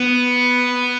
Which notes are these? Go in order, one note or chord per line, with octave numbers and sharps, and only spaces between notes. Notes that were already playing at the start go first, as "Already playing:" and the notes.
Already playing: B3